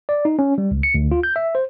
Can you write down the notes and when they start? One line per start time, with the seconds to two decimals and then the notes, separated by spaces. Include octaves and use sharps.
0.09 D5
0.25 D#4
0.39 C#4
0.58 G3
0.71 C#2
0.83 C#7
0.95 D2
1.11 F4
1.23 G6
1.36 E5
1.55 C5